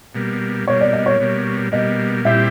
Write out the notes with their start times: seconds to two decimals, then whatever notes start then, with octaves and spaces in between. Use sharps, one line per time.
0.15 B2 G3 A#3
0.68 B2 G3 A#3 C#5
0.81 D5
0.93 D#5
1.06 C#5
1.20 B2 G3 A#3
1.72 B2 G3 A#3 D#5
2.25 A#2 G3 C4 E4 G4 E5